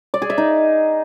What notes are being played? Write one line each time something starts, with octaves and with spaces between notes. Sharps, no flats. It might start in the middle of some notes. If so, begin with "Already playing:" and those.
D5
G#4
E5
D#4